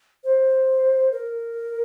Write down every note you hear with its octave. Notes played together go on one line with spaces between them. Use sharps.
C5
A#4